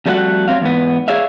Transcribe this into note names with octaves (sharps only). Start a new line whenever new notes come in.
F2 G3 A3 E4 F#4 F#5
F#3 C4 F5
E2 G#2 B3
G#4 C#5 D5 E5 F5